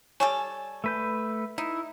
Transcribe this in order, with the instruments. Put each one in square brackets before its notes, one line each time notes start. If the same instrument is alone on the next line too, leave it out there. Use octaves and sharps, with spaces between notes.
[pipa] G3 A4 C#5 [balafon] G#5
[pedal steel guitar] A3 B4 G6
[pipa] D#4 [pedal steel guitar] E4